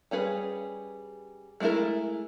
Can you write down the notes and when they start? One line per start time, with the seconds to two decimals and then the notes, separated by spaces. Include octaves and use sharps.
0.11 G3 C#4 G#4 B4
1.60 G#3 A3 B3 E4 A#4